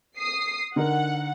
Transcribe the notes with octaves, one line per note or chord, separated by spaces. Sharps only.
D#6 C7
D3 D#4 A#4 F#5